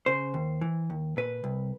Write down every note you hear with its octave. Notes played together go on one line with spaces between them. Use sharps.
C#3 C5
D#2
E3
D#2
A#2 B4
C2